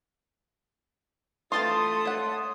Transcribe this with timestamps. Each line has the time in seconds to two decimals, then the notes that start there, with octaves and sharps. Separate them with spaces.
1.52 E3 A3 C4 F4 C6 D#6 A6
2.05 C#5 F#5